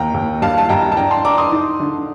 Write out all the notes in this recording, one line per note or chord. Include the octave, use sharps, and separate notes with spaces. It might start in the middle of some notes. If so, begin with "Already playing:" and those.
Already playing: D#2 G5 A#5
D#2
G2 F5 A5
A5
G2 G5 A#5
A5
D4 G5 A#5
A5 C6
D4 A#5 D6
C6 D#6
D#4
D3